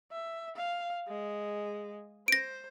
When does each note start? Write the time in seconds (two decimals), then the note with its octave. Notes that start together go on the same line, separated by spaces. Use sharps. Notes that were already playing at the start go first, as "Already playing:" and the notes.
0.12 E5
0.56 F5
1.08 G#3
2.28 C5 A#6 D7